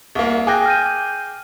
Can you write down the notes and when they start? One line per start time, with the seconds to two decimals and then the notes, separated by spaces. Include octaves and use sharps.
0.15 C2 A#3
0.47 G#4 G5 D6 F#6 A#6
0.66 F6 G6 D#7